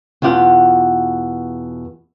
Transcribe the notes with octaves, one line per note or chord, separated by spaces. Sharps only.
E2 B2 F4 G4 F#5